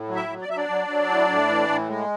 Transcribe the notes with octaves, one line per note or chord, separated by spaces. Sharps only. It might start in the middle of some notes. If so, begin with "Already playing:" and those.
Already playing: A2
F#3
E4 E5
F#3
D5
F#3 E5
D4 D5
F#3
F#3
A2
A2
E3
A2
G#3